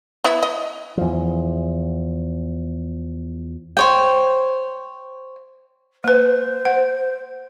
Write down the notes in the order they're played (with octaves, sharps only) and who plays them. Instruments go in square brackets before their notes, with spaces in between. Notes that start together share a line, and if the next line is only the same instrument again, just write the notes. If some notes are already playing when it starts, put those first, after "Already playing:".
[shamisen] B3 E4 E5
D#5
[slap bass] E2 F3
[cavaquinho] C5 C#5 G5
[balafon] A#3 B4 [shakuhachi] C5
[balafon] F#5